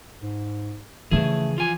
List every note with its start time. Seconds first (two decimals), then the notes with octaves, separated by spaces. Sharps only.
0.22 G#2
1.11 C#3 E3 F3 A3 G#4
1.58 F4 G#5